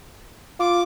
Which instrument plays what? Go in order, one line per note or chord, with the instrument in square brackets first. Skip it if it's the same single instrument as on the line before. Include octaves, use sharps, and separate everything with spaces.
[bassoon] F4 [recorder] D6